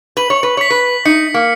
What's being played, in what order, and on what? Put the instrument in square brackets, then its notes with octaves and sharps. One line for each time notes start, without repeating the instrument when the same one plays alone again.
[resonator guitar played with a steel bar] B4 [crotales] F#7
[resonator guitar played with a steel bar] C#5
B4
[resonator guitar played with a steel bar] C#5 [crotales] B6
[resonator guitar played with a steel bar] B4
[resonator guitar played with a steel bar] D#4 [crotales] C#7
[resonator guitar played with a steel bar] A#3